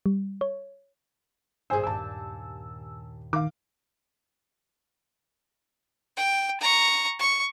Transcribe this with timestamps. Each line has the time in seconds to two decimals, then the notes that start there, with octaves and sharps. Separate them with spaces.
0.06 G3
0.41 C#5
1.70 G#1 G2 A#2 G#4 C5 G#5 E6
1.84 D#2 G#5 A5 D6 E6 G6
3.33 D#3 F5 D6
6.17 G5
6.60 A#5 C#6
7.20 C#6